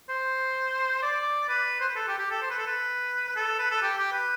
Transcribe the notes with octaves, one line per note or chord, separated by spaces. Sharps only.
C5
D5
B4
C5
B4
A4
G4
G4
A4
C5
B4
A4
B4
B4
A4
B4
A4
G4
G4
B4